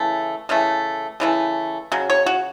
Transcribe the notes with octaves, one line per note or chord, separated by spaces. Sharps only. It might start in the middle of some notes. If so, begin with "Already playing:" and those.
Already playing: C#3 E3 A3
C#3 E3 A3
C#3 E3 A3
C#3 F#3
C#5
F#4